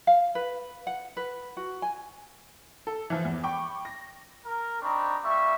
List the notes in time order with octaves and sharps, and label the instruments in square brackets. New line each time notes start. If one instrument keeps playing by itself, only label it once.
[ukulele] F5
B4
F#5
B4
F#4
G#5
[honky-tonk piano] A4
E3 F3
E2
G5 B5 C#6 D6
A#6
[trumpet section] A#4
C4 D4 D#4 A#5 B5 C#6
G3 A#3 E5 C#6